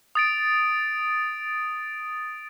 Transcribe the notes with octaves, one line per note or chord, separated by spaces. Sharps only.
D#6 A6 D7